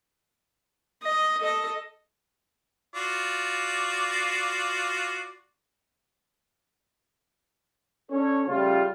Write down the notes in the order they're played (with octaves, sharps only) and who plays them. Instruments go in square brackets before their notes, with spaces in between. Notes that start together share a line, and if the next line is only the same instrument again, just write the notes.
[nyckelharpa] D#5
A4 D#5
[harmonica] F4 F#4 D5
[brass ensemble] C#4 D4 A4 C#5
C#3 G3 A3 F4